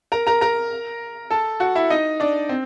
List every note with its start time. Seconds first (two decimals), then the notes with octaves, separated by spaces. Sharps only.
0.12 A#4 A#5
0.27 A#4 A#5
0.41 A#4 A#5
1.31 A4 A5
1.60 F#4 F#5
1.75 E4 E5
1.90 D#4 D#5
2.20 D4 D5
2.49 C4